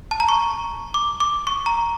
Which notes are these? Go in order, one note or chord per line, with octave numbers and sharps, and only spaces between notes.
A5
A#5
C#6
D6
D6
C#6
A#5